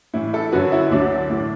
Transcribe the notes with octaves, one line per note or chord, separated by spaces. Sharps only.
A2 E3 E4
E4 A4
F#2 D3 F#3 F#4 B4
E4
D2 D3 F#3 D4
A2 E3